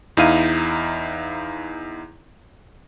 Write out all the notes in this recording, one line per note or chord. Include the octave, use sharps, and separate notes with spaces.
E2 D#4 E4 F5 D#7